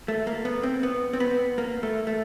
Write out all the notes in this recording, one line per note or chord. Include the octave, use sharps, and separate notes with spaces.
A3
A#3
B3
C4
B3
C4
B3
A#3
A3
A3